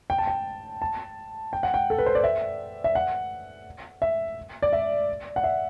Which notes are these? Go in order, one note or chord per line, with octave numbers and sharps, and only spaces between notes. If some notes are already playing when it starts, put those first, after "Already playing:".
G5
A5
G5
A5
G5
F#5
G5
A4
B4
C5
D5
E5
E5
F#5
E5
D5
E5
F#5
E5